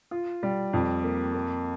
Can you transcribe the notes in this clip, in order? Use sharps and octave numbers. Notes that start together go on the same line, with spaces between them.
F4
G3
F2
A#3
A#3